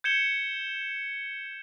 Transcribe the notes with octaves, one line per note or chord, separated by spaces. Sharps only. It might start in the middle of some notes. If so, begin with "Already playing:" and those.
G6 G#6 C#7 E7 G7